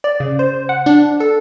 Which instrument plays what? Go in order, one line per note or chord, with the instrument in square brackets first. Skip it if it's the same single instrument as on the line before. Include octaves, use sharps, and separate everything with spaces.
[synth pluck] D5
C#3
C5
F#5
D4
A4